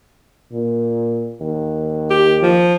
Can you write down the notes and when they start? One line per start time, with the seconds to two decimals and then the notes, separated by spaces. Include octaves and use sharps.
0.53 A#2
1.40 D#2
2.11 G4
2.43 F3